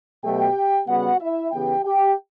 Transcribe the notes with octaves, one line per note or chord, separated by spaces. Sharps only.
B2 F#3 A3 G4 G5
C#3 G3 B3 F#4 F#5
E4 E5
C#3 E3 B3 G4 G5
G4 G5